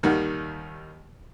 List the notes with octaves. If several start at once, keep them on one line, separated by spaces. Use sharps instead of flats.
D#2 D#3 G3 F#5